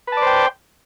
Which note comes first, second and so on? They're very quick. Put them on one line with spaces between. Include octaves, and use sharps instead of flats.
B4 A5 D5 C5 G5